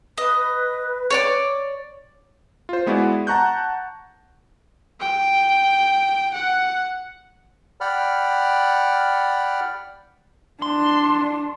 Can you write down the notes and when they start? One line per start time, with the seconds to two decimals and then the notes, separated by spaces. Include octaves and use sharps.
0.18 B4 D#5
1.10 C#5 D5 D6
2.69 F4 C5
2.86 G#3 B3 E4 F#4 D5
3.27 F#5 A5 A#5 C#6 F#6 G6
5.01 G5
6.34 F#5
7.81 D5 F#5 G5 B5 F6
10.62 D4 C6